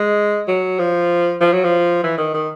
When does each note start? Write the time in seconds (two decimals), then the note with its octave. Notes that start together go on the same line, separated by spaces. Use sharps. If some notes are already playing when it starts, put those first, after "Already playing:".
Already playing: G#3
0.48 F#3
0.79 F3
1.41 F3
1.52 F#3
1.64 F3
2.03 E3
2.18 D#3
2.34 D#3